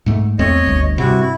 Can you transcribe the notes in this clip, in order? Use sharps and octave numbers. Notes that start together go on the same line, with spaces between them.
G#2 A3
E2 A3 C4 C#5 D#5
G1 D2
G2 C3 E4 F#4
E4